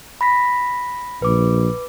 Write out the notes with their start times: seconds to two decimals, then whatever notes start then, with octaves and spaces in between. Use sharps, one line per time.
0.21 B5 A#6 B6
1.22 A#1 B4 D6